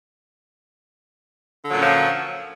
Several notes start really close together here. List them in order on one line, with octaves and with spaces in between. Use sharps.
D3 F#3 A#2 C#4 F3